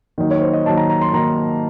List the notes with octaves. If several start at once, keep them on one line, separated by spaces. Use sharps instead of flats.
D#3 F#3 A#3 D#4
C#5
C5
D#5
D#3 F#3 A#3 D#4 A5
A#5
A#5
C6
D#3 F#3 A#3 D#4 A#5